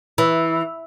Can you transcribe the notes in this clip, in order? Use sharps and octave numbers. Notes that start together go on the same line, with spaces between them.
E3